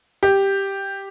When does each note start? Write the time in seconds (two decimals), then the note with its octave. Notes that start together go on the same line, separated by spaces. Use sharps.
0.23 G4